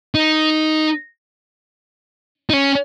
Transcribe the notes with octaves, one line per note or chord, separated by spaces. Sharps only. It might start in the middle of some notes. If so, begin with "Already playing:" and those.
D#4
D#4
C#4